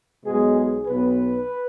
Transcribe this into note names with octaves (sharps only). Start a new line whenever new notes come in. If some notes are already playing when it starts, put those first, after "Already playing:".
B1 B2 G#3 B3 G#4
G#4
B1 B2 B3 B4